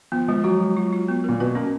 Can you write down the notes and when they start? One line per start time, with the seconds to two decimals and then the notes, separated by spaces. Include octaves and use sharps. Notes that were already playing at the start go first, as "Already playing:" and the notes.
0.12 F3 B3
0.28 F3 G#3
0.44 F#3 F#4
0.60 G#3
0.77 F4
0.93 F4
1.08 B3
1.24 A#2 A#4
1.40 B2 B4
1.55 A#3 C#4